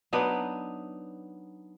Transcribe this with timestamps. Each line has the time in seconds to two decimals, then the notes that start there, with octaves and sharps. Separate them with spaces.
0.13 F#3 B3 D4 D#4